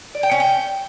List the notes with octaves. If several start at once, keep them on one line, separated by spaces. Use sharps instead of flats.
D5
G5
C#4
G5